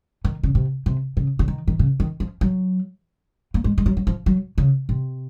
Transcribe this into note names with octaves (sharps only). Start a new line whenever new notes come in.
D#3
C#3
C3
C3
C#3
C#3
D#3
D#3
C#3
D#3
F3
F#3
A#3
G#3
G#3
F#3
F#3
F3
F#3
C#3
C3